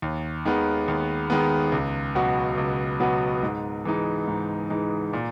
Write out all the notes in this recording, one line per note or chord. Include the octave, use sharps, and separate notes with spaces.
D#2
D#3 G#3 B3
D#2
D#3 G#3 B3
C#2
B2 F#3 B3 F#4
C#2
B2 F#3 B3 F#4
G#2
E3 G#3 D#4
G#2
E3 G#3 D#4
A#2